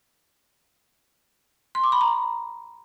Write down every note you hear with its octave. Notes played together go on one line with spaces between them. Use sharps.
C6
D6
B5
A#5